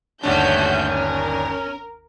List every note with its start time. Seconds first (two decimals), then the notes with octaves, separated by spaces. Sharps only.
0.23 G1 D#2 A3 C#4 D4 F#4 G6
0.91 A#4